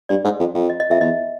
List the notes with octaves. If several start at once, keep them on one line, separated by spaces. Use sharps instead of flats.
G2 D5
G#2
F2
F2
D#5
D#5
F2 E5
E2 D#5